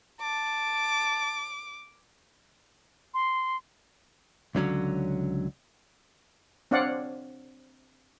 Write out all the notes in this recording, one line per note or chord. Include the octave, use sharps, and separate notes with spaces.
A5 D6
C6
C#2 D3 F#3 C#4
C4 D4 C#5 D5 F5 F#5